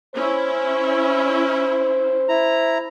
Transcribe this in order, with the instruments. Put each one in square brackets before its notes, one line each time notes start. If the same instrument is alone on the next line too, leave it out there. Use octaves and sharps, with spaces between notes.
[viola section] C#4 E4 [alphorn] C5
[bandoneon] E4 A#5